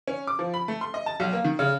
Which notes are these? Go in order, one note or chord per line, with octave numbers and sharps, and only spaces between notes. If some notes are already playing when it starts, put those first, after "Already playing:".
C#4
D6
F3
B5
A3
C6
D#5
A5
B1
A#3
D#3
C#3